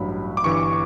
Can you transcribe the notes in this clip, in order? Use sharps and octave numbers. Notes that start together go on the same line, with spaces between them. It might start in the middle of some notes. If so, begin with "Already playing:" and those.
Already playing: A1 G2 F#3 B5
D6
G1 G2 E3 C#6